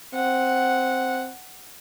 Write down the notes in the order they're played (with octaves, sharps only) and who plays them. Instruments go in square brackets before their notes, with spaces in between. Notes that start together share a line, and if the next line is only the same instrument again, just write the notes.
[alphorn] C4 [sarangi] F#5